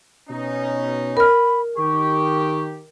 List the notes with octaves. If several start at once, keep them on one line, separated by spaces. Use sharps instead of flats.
B2 C#4 D#4
A#4 B5 F6
D#3 G4 C#6